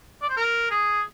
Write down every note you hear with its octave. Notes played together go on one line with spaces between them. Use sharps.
D5
C5
A#4
G#4